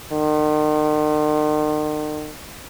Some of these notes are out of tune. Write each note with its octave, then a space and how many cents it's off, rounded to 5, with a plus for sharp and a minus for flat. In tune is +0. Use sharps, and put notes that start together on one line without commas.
D#3 -40